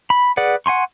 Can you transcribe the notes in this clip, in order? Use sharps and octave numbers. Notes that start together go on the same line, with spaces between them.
B5
G#4 B4 D5 F#5
F#5 G#5 C6 C#6